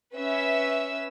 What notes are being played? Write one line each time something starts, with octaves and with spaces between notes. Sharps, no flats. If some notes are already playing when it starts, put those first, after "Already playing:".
C#4 B4 E5 E6